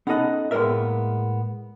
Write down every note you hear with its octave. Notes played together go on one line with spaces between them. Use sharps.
B3 C#4 D#4 A4 D#5 F#5
A2 G#3 A#3 B3 A#4 E5